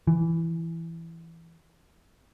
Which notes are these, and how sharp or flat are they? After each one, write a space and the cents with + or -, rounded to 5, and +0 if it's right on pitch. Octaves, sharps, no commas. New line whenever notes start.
E3 +10